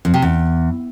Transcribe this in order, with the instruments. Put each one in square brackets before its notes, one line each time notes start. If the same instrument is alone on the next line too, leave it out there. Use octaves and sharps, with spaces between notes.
[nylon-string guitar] F2
C3
E2